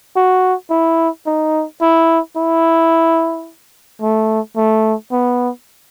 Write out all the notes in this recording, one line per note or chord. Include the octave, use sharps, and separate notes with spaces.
F#4
E4
D#4
E4
E4
A3
A3
B3